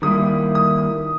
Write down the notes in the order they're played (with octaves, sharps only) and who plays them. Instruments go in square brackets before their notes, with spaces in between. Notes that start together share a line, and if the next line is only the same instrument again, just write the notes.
[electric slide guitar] D#3 G3 A#3 E4 [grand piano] D#6
[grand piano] D#6